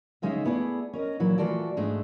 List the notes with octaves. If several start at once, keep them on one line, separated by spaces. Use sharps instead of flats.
D2 C#3 G#3 C#4 D#4 E5
A3 B3 E4 G#4 C5 D5
C#4 A#4 D#5
A#2 E3 F#3 E4
E3 A3 F4 F#4 A4 D5
G#2 G#3 A3 D4